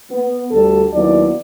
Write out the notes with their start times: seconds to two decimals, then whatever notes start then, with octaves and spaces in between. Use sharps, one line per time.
0.11 B3
0.52 D2 D3 G3 A4
0.94 D#2 F#3 B3 D4 E4 D5